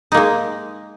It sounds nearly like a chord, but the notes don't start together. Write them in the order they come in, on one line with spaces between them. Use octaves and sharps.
D#4 A#3 G#3